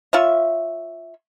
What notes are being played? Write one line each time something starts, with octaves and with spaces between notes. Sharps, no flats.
F4 C#5 E5